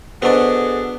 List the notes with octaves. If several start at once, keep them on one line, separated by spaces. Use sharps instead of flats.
B3 D4 F#4 G#4 A4 C5 D#5 C#6